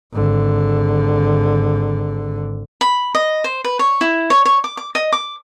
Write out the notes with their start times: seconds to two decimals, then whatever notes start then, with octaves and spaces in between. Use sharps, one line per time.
0.13 G#1 D3
2.81 B5
3.15 D#5
3.44 C5
3.64 B4
3.79 C#5
4.01 E4
4.30 C#5
4.45 C#5
4.64 D6
4.77 D6
4.95 D#5
5.12 D6